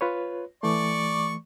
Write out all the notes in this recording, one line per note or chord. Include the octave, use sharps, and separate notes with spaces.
F4 B4 C#5
E3 A3 D5 C#6